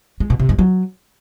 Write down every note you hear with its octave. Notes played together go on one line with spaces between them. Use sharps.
G#3
B2
C3
G2
F#3